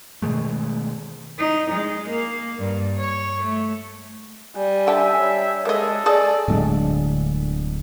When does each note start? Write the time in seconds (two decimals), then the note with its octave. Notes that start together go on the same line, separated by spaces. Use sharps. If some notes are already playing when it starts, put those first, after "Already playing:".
0.22 B2 D#3 G#3 A3
1.38 D#4
1.72 G#3
2.09 A#3
2.58 G2
2.98 C#5
3.43 A3
4.55 G3 G#5
4.87 D3 E5 G5 A5
5.17 G3 C#5
5.65 G#3 A#3 A4 D#5
6.06 G#4 D5 D#5 G#5 A5
6.48 D1 D3 G#3